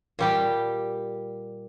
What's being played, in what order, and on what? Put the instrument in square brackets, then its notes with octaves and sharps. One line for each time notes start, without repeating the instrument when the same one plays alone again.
[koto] A#2 G3 G4